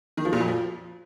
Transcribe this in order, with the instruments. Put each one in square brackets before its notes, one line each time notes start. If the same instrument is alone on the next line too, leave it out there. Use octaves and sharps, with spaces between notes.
[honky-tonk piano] D#3
F3
A#2
F2
F3